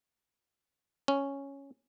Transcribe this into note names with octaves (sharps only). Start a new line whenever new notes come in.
C#4